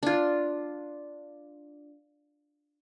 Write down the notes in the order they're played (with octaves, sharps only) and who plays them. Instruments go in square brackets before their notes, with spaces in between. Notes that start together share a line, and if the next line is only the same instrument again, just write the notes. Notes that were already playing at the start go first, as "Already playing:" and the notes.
[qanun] D4 F4